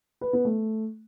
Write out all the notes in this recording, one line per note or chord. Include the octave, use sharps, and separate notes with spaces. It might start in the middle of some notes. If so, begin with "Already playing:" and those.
B4
B3
A3